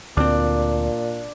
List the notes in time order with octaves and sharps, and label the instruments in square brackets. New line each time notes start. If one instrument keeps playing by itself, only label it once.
[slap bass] D2 C4 [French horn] A#2 [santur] D4